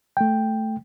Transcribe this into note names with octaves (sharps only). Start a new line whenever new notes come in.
A3 G5